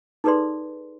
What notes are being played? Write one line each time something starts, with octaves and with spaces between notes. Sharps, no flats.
D#4 G#4 A4 B4 D5 C6